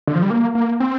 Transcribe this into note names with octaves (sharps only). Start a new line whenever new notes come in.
D3
F3
G3
A#3
A#3
C4